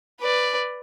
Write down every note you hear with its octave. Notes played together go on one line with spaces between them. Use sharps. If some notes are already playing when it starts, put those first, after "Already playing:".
B4 D5